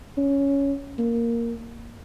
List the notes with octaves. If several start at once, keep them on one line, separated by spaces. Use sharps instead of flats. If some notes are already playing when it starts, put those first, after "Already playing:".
C#4
A#3